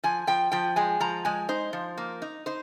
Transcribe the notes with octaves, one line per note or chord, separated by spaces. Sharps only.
F3 G#5
F3 G5
F3 G5
G#3 G#5
F3 A#5
G#3 G#5
D#4 C5
F3
A#3
D#4
D#4 C5